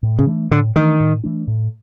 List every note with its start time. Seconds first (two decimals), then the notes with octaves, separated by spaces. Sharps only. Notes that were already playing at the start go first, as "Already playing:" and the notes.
0.03 A2
0.19 C#3
0.27 E3 A3 D4
0.51 A2 D3
0.76 D#3 E3 A3 D4
1.00 A2
1.24 E3 A3 D4
1.47 A2